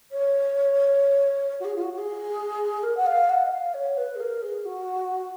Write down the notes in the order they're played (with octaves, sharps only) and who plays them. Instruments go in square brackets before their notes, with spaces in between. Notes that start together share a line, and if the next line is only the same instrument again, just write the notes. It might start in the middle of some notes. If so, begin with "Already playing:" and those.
[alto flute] C#5
F#4
G#4
F4
F#4
F#4
G#4
A#4
F#5
F5
F#5
D#5
F5
C#5
B4
G#4
A#4
G#4
F#4